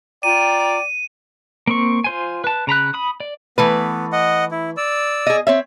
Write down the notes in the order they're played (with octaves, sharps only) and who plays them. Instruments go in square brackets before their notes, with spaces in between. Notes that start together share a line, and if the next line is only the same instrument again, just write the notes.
[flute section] F4 G5 A#5 [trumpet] D5 [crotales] D#7
[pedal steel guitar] A#3 C4 C#6
F4 C5 G#5
B4 A5
C#3 A#5 B5 F#6
B5 D#6
D5
[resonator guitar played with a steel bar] E3 A3 B4 [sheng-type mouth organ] B3
[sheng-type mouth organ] D#5 F#5
E4
D5 E6
[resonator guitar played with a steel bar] G#4 D#5
C4 C#5 E5